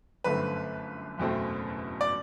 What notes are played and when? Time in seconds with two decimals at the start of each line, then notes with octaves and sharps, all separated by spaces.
0.24 G1 F#2 D3 A3 C4 B4
1.18 F#1 E2 B2 A3 C4
2.01 D5